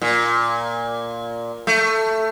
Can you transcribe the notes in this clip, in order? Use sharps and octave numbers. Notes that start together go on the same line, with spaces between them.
A#2
A3